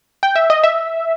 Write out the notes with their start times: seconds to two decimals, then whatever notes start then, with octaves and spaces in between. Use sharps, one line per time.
0.23 G5
0.35 E5
0.50 D#5
0.64 E5